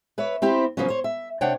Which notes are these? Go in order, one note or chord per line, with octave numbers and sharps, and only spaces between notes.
B4 C#5 E5
C4 E4 G4 C5
C#3 F3 F#3 A#3 B3 C#4
C5 C#5
E5
C3 D4 C#5 F#5 G5